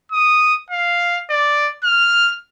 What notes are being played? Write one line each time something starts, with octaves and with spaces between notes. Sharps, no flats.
D#6
F5
D5
F6